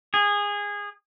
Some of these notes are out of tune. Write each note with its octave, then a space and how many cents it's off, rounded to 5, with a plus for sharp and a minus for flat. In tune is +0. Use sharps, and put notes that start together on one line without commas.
G#4 -20